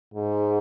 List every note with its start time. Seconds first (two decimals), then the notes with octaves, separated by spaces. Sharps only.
0.14 G#2